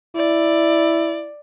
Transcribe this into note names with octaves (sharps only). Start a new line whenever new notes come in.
E4 D5